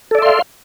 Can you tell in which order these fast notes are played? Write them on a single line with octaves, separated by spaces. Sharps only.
A4 D5 E5 C6 F5